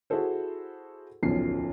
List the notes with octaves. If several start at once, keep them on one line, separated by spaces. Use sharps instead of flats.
E4 F#4 G#4 A4 C5
D1 B1 E2 F3 C#4 C7